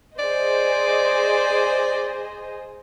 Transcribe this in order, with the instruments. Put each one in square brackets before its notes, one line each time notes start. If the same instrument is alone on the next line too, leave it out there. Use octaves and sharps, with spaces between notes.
[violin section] G#4 C5 D#5 [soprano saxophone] D5